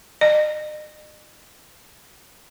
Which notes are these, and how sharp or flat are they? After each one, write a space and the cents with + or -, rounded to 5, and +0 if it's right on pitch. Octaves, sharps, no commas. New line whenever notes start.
D#5 -40